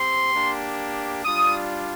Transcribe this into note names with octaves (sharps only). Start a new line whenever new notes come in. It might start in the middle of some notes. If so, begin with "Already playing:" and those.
Already playing: C4 G4 C6
A#3 D4 G4
G3 D4 F4 D#6